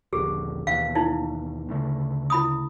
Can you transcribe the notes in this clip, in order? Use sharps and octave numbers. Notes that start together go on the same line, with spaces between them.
D#1 A#1 D3 G4 G#4
D#2 B2 E3 F5
D#4 E4
D2 C#3 A3
E4 B5 D#6